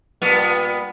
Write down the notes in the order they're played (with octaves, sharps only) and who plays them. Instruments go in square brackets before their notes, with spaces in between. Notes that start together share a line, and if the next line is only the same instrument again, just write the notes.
[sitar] G2 A#2 B3